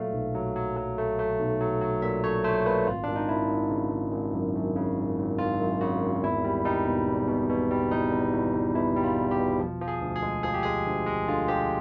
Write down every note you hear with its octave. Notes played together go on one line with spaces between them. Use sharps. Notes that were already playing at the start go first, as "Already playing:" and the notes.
Already playing: A#2 F#3 A3 F5
B1
F#3
F#3
F#3
A3
A3
B1
F#3
F#3
A#2 E5
A3 C#5
A3 C5
A#2 B4
G#1 F4
G#1 D4
D#4
G#1 E4
G#1
C#3
G#1
G#1
F#2
F#2
C#3
G#1
G#1
G#1 F4
F#2
C#3 F#4
G#1
E2 E4
G3
G3 D#4
B2
E2
B2
B2
G3
E2 D#4
E2
E2
E2
B2 E4
G3
F4
E2
G4
B2
F3
F3
G#4
D2
G#4
G#3
F3 G#4
G4
G#3 G#4
D2
G#3
D3 F4
F3 G4